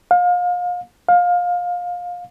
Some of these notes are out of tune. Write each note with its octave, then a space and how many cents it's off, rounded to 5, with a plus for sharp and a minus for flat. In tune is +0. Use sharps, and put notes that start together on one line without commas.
F5 +35
F5 +25